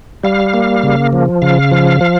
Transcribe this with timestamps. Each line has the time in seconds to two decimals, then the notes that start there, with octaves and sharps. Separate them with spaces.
0.24 G3 F5
0.54 A#3
0.83 C#3
1.13 F3
1.42 C#3 F5
1.71 F3
2.01 F3